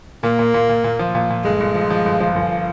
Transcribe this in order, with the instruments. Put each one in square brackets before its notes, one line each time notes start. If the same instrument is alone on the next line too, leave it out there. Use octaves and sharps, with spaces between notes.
[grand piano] A#2 [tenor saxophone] A#3
[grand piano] A#2
A#2
A#2
A#2
F3
A#2
A#2
[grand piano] G1 [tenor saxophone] G#3
[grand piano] G1
F3
F3
G1
F3
G1